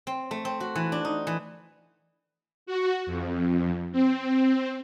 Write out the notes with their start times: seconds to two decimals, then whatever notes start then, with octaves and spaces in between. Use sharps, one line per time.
0.07 C4
0.31 A3
0.45 C4
0.60 F#4
0.75 E3
0.92 D4
1.05 D#4
1.27 E3
2.66 F#4
3.06 F2
3.92 C4